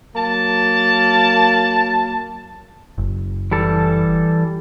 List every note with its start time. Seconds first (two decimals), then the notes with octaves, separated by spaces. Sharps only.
0.16 F#3 A#3 A5
2.98 F#1
3.51 E3 G3 A4